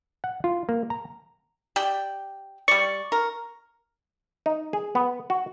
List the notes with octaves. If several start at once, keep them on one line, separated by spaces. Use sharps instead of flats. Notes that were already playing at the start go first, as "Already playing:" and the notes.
F#5
F4
A#3
A#5
G4 D5 G5
G3 D5 C#6
A#4
D#4
G#4
B3
F#4